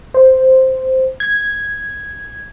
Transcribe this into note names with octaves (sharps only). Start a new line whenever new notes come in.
C5
G#6